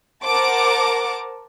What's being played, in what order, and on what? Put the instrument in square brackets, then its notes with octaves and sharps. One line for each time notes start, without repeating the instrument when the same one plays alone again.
[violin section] A#4 C5 F#5 A5 D6